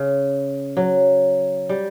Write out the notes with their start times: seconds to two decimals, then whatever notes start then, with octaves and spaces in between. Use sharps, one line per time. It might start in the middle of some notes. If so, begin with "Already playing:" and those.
Already playing: C#3
0.77 F#3
1.69 G3